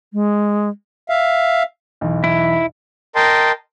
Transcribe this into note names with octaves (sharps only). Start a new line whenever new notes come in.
G#3
E5 F5
B1 E2
E4
A#4 D#5 G5 A5 C6